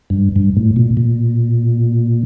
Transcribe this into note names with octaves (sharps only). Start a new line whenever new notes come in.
G2
G2
A2
A#2
A#2